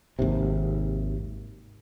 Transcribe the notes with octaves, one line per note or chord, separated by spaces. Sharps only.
G#1 D#2 C3